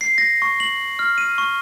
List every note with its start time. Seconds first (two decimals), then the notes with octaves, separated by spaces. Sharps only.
0.01 C7
0.18 A#6
0.42 C#6
0.60 F#7
0.99 F6
1.18 D#7
1.38 C#6